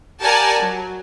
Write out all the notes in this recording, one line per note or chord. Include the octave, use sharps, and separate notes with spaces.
G4 A#4 D5 F#5 G#5 A5
F#3